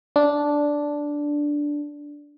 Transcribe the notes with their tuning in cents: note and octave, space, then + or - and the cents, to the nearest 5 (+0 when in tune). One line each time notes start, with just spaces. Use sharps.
D4 -5